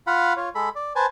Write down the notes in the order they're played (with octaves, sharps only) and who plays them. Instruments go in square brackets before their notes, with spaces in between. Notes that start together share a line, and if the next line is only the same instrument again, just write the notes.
[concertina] F4 F5 F#5 B5
F4 C#5
G#3 A4 B5
D5
B4 C5 G#5 A5